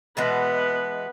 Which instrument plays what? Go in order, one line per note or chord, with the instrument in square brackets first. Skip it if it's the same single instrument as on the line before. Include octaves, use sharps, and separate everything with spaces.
[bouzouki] B2 E3 G#3 [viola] B3 B4